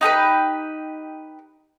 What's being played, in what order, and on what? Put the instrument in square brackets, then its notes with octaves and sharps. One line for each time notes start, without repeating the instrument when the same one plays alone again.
[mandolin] D#4 G4 A4 B4